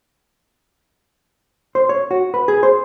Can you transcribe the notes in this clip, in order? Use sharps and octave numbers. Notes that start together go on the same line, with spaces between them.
C5
C#5
F#4
B4
G#4
C5